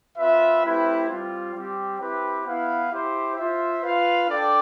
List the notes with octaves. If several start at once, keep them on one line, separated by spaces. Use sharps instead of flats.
C4 F4 B4 E5
A3 C4 E4 G4 B4
G3 C4 F4
G3 C4 G4
C4 E4 G4 B4
B3 E4 B4 F5
E4 G4 C5
F4 C5 E5
F4 B4 F5
D4 A4 D5 G5